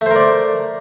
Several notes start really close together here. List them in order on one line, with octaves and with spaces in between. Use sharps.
A3 C5 A#4 D5